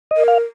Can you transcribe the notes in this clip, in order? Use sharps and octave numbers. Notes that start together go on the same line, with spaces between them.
D#5
A#4
F5